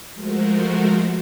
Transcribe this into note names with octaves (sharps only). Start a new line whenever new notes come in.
F3 G#3 A3 F#4 A#4 C5